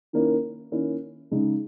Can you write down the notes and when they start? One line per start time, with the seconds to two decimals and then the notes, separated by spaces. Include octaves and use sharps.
0.13 D#3 A#3 C#4 E4
0.72 D#3 A#3 C#4 E4
1.31 C#3 G#3 D#4